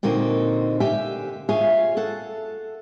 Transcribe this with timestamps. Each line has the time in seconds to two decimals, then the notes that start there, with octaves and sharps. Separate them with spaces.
0.03 A#2 D3 A#3 C4 D#4 F#4
0.80 D3 G4 E5 F5 G#5
1.49 F4 G#4 C#5 E5 F5
1.97 A4 F#5